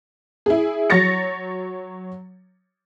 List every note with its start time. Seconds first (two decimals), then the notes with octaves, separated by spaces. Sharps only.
0.46 E4 G#4
0.90 F#3 C#5 A6 A#6 C#7